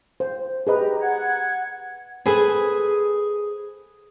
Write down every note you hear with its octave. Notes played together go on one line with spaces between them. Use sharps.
C5
G4 G#4 B4 D#5 A#5
F#5 G#6
G#4 A4 B4 C5 G#5